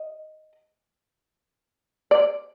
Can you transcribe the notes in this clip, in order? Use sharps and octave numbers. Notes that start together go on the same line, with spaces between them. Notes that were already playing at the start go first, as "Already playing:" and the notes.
Already playing: D#5
D5